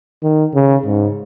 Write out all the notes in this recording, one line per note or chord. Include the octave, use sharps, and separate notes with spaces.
D#3
C#3
G#2